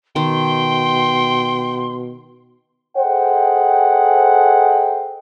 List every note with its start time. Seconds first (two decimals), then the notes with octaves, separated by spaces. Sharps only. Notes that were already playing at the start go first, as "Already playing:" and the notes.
0.16 B2 D#3 G5 C6
2.97 G#4 A4 C5 D#5 F#5 G5